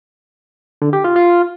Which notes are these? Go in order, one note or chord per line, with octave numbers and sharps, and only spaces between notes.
D3
G4
F4
F4